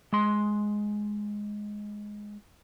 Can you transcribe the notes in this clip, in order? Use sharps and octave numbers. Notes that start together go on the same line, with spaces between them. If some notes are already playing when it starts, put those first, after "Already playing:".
G#3 C6